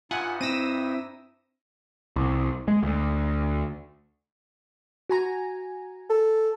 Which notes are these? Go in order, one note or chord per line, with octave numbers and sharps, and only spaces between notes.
G2 D#4 F4 E5 F#5 G#5
C4 E4 E6 A#6 D#7
C2
G#3
D2
F#4 G#5 A#5
A4